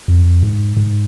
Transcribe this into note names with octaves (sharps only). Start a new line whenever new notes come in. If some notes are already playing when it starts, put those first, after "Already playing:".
F2
G#2
G#2